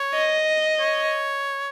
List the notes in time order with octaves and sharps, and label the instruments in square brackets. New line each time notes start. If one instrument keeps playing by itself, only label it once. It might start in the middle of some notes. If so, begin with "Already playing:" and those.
Already playing: [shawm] C#5
[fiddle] D#5
[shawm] C#5